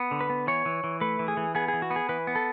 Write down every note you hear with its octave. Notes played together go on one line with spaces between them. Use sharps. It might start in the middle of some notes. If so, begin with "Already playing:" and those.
Already playing: B3
D3
B4
B3
E3 C#5
E3
E3
A3 B4
E3
G#4
E3
B3 G#4
G#4
E3
F#4
B3
G#4
E3 B4
B3
A4